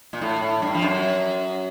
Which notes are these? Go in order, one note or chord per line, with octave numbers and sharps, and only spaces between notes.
A#2
A2
A2
G2
F3
F#2